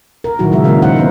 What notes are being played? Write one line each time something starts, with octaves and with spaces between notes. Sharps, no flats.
A#4
A#2 D#3 F#3 E4 F#4
C#3 G#3 E5
A#3 D#4 E4 A#4 F5
G#3 D#4 A#4 C5 F#5
D#3 E3 G#3 B3 D#4 B4